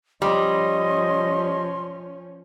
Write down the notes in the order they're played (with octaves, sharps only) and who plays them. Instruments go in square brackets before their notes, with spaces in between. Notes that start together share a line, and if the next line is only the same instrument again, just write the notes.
[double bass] F3 C#4 [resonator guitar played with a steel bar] G3 [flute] D#5 [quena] C6